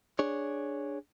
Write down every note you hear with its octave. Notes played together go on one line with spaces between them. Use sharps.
D4 G#4 C#5